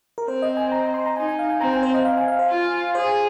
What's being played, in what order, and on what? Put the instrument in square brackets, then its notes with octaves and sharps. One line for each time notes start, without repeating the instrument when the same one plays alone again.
[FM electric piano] A#4
[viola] C4 [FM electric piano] C5
[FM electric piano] D#5
G#5
A#5
A#5
C6
A#5
[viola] D#4 [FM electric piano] G#5
[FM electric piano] G#5
F5
G#5
[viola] C4 [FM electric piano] A#5
[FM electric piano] G#5
C5
D#5
F5
G#5
F5
C5
[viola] F4
[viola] G#4 [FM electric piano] C5